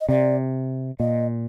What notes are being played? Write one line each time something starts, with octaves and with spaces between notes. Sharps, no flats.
D#5
C3 D5
A#2 D#5